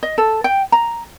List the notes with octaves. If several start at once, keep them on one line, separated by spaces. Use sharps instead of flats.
D#5
A4
G5
A#5